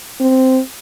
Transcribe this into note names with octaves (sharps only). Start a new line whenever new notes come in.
C4